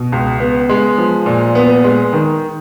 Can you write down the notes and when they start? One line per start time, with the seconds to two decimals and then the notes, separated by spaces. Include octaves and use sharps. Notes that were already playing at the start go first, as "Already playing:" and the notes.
Already playing: B2
0.12 C#2
0.40 B3
0.69 G#3
0.98 F3
1.26 A#2
1.55 B3
1.84 G#3
2.13 D#3